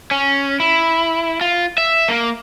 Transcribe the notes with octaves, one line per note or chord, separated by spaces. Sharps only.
C#4
E4
F4
E5
A#3